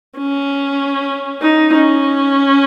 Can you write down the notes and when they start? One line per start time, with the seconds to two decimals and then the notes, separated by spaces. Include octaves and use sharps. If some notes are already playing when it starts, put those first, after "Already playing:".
0.18 C#4
1.42 D#4
1.72 C#4